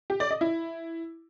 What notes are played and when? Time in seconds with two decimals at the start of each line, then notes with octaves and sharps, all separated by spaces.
0.10 G4
0.20 D5
0.31 D#5
0.41 E4